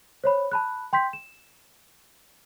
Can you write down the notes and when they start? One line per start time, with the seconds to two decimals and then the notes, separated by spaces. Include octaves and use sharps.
0.24 C5 C#5 B5
0.52 A5 B5 F#6
0.93 G5 C6 G6 B6
1.13 E7